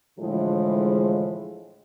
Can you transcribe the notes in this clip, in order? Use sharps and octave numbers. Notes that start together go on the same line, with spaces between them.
A2 D3 E3 F3 G#3